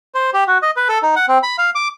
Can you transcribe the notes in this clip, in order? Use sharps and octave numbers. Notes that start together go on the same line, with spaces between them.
C5
G4
F#4
D#5
B4
A4
D#4
F#5
C4
B5
F5
D6